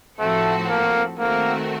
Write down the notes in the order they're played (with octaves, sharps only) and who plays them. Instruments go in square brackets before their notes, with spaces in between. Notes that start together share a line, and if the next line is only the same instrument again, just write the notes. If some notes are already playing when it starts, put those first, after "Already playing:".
[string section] A2 F3 C4 F#4 A4 [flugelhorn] A3
[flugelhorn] A#3
[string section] D#3 A3 C4 F#4 A#4 [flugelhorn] A#3